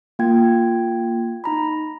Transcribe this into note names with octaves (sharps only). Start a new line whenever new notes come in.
A#3 F4 G5 G#6
D#4 A#5 B5